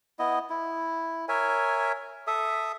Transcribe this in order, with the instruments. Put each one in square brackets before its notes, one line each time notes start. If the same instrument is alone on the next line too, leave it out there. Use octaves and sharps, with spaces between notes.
[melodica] B3 E4 D#5
E4
A#4 C#5 E5 G#5
A4 E5 D#6